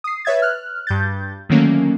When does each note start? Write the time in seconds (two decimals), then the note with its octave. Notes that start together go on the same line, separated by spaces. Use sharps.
0.04 D#6 C7
0.25 B4 C#5 E5 G#6 A6
0.42 F6 F#6
0.87 G2 G6 A6
1.49 D3 D#3 F#3 A3 A#3 C#4